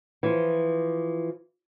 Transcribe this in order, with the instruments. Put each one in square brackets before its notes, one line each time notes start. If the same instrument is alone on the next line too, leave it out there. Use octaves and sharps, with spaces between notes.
[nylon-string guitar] E3 F3